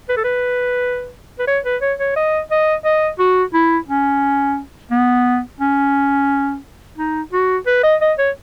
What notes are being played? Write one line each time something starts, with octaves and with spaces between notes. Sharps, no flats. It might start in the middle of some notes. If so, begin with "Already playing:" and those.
B4
A4
B4
B4
C#5
B4
C#5
C#5
D#5
D#5
D#5
F#4
E4
C#4
B3
C#4
D#4
F#4
B4
D#5
D#5
C#5